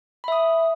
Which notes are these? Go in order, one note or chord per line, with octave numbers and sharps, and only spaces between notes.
E5 B5 D#6